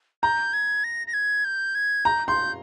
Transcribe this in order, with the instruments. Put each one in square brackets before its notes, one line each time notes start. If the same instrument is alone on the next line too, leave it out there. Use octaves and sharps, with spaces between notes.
[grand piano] A#5 [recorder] G6
[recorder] G#6
A#6
A#6
G#6
G6
G#6
[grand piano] A#5 [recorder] G6
[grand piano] C6 [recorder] G6